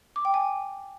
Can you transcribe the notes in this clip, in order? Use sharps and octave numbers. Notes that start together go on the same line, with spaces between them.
D6
G5
G#5